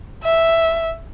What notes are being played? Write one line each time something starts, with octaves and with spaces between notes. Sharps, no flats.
E5